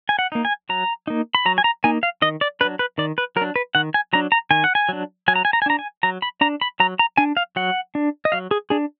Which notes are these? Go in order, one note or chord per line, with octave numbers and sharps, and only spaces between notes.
G#5
F#5
A#3 D#4
G#5
F#3 A#5
A#3 D#4
B5
F#3 A#5
G#5
A#5
A#3 D#4 G#5
F5
D#3 D#5
D5
F#3 D4 B4
B4
D#3 D5
B4
F#3 A#4
D4
B4
D#3 F#5
G#5
F#3 D4 A#5
A#5
D#3 G#5
F#5
G#5
F#3 D4
F#3 G#5
A#5
G#5
A#5
G#5
D4 A#5
G#5
F#3 A#5
B5
D4 A#5
B5
F#3 A#5
A#5
D4 G#5
F5
F#3 F#5
D4
D#5
F#3 F5
G#4
D4 G#4